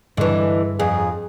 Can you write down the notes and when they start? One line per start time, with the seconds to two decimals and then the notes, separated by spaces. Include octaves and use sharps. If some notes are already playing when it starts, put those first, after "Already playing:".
0.17 G2 D3 E3 G#3
0.79 F2 G#4